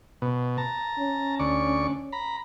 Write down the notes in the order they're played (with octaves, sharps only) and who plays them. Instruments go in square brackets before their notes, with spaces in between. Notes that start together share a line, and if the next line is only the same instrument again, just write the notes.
[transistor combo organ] B2
A5 A#5
[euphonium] C#4
[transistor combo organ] D2 D5 C#6
A#5 B5